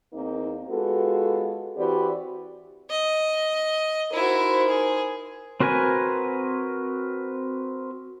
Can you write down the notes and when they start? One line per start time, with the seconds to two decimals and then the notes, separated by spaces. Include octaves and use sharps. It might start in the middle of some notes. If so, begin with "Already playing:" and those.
0.14 E2 A#3 C4 D#4
0.69 G#3 B3 F4 F#4 A4
1.77 E3 C4 F#4 G4 B4 D5
2.90 D#5
4.13 D#4 E4 F#4 A#4 C5
4.68 G#4
5.60 C4 F#4 A#4 B4 G#5